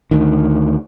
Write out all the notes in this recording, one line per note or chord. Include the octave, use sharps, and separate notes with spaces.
D2 D#3